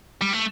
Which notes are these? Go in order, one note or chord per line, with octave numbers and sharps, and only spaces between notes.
G3
A3